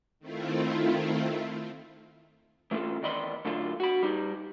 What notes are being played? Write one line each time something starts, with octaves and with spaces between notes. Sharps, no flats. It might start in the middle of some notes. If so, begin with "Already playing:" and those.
D#3 A3 C4 E4 F4
E3 A3 C#4 F4 A4
E2 D#3 D5 D#5 B5 C6
F#2 D3 A3 F4
F#4 B5
G3 D#4